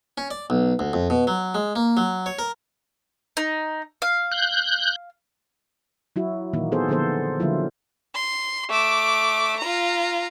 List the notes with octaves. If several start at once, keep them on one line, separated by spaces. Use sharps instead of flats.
C#4
D5
B1
D2
F2
B2
F#3
G#3
A#3
F#3
C#5
A#4
D#4
F5
F#6 G6
F#3 E4 F#4
A#2 D#3 E3 A#3 D#4 F#4
B3 G#4 A4 C5
D3 F3 B3 A4 C5
D3 F3 F#3 A#3 E4 F4
C6
A3 D6
F4 A#5